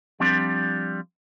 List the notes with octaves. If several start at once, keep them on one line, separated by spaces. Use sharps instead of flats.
F3 G3 C4 D4